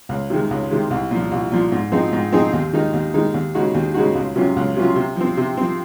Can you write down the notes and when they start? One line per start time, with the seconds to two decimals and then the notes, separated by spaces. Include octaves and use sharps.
0.09 C#2
0.30 C3 D#3 G#3
0.51 C#2
0.71 C3 D#3 G#3
0.91 C2
1.11 A#2 F3
1.31 C2
1.52 A#2 F3
1.72 G#2
1.92 F3 C4 D#4 G#4
2.13 G#2
2.32 F3 C4 D#4 G#4
2.53 D#2
2.73 D#3 G#3 D#4
2.93 D#2
3.14 D#3 G#3 D#4
3.34 D#2
3.55 C#3 G#3 D#4 F#4
3.74 D#2
3.94 C#3 G#3 D#4 F#4
4.15 C#2
4.36 C3 F#3 C#4 F4
4.56 C#2
4.76 C3 F#3 C#4 F4
4.96 C3
5.16 F3 C4
5.37 C3
5.57 F3 C4